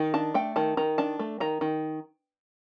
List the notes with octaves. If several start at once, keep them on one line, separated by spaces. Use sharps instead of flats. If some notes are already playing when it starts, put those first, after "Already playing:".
Already playing: D#3
D4 A5
A3 G5
D#3 A5
D#3 A#5
D4 A5
A3
D#3 A#5
D#3